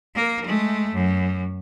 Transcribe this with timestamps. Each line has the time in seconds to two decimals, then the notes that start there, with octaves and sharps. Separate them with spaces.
0.15 A#3 A#4
0.45 G#3 A3
0.94 F#2